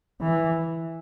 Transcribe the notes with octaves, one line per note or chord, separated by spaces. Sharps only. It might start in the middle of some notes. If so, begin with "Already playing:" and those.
E3